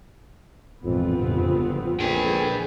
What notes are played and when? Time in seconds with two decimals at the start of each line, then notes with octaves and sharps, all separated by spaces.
0.84 G#1 F2 A#2 E3 B3 C4 F4
1.17 G1 F2 G#2 C#3
2.00 A#1 D3 E3 G#4 B4 G5 G#5